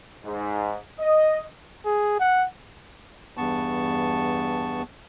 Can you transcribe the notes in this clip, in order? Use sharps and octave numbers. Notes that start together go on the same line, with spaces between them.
G#2
D#5
G#4
F#5
E2 G2 B3 A5 C#6